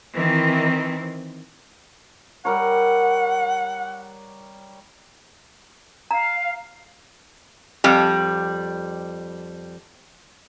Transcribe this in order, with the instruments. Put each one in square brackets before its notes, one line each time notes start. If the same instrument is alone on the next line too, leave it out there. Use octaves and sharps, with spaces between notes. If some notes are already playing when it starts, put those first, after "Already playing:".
[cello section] D#3 E3 C4
[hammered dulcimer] G3 A#4 C#5 [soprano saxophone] F#5
[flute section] F5 [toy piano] A#5
[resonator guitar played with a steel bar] F2 G3